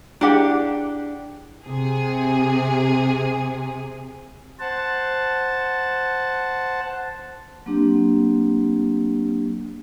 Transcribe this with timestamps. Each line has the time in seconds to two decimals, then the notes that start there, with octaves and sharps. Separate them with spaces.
0.21 D4 E4 G4 G#4 F#5
1.66 C3 G#4
4.60 C5 F#5 A5
7.66 F#3 A#3 C4 D4 G4